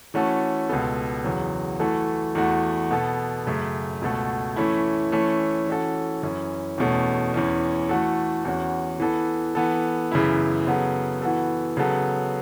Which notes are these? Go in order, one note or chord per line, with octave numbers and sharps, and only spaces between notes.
E3 A3 C#4 F#4 A4
C#2 B2 B3 A4
E2 C#3 F#3
E3 A3 F#4 A4
E2 E3 A3 F#4
B2 B3 A4
F#2 C#3 A3
C#2 B2 A3 F#4 A4
E3 A3 C#4 E4
E3 A3 C#4 A4
E3 C#4 F#4 A4
F#2 E3 C#4
E2 B2 A3 C#4
E2 E3 C#4
E3 A3 F#4 A4
E2 E3 C#4 F#4
E3 B3 A4
E3 B3 A4
F#2 C#3 E3 B3 E4
C#3 F#3 B3 A4
E3 B3 F#4 A4
C#3 F#3 B3 A4